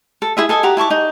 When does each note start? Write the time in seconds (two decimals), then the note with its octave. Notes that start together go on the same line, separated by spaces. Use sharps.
0.22 A4
0.37 E4 G#4 E5
0.49 A4 D#5 G#5
0.63 F#4 G4 A#5 D6
0.77 E4 A5 C#6 D6
0.90 D#4